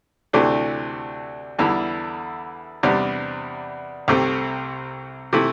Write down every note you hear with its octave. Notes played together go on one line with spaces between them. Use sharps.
D2 C3 E3 A3 D4
E2 D3 G3 E4
E2 C3 G3 D4
C2 C3 A3 C4
C3 E3 A3 E4